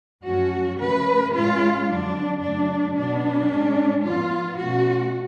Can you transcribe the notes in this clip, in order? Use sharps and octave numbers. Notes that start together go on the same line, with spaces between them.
F#2 F3 A3 C#4 F#4
C#3 F3 A3 C#4 B4
A2 G#3 C#4 F4
F2 D3 F#3 D4
F#2 C#3 F#3 A3 D4
B2 F#3 B3 D4
A2 G#3 C#4
A2 F3 B3 F4
B2 A3 C#4 F#4